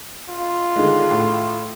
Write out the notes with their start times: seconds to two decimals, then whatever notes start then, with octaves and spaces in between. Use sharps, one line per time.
0.29 F4
0.76 D3 D#3 G#3
1.11 A2